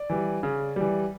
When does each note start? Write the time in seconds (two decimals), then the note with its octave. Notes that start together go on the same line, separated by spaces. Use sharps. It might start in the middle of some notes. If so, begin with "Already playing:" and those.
Already playing: D5
0.10 E3 G3
0.43 C#3
0.76 E3 G3